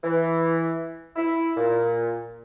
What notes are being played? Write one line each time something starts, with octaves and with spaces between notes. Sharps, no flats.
E3
E4
A#2